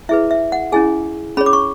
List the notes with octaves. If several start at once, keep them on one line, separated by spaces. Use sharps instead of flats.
E4 G#4 B4 E5
E5
F#5
C#4 E4 G#4 G#5
C#4 G#4 C#5 B5
D6
C#6